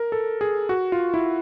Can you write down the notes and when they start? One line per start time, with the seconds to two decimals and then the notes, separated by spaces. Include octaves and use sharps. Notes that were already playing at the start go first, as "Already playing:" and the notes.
Already playing: A#4
0.12 A4
0.41 G#4
0.69 F#4
0.92 F4
1.14 E4